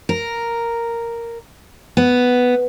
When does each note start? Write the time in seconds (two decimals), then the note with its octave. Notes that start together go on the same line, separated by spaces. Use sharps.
0.09 A#4
1.97 B3